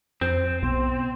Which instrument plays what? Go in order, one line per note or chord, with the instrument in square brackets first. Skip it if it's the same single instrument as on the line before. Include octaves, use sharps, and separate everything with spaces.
[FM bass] F2 [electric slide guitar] C4 [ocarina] C5
[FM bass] B1 [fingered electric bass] B2 [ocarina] C6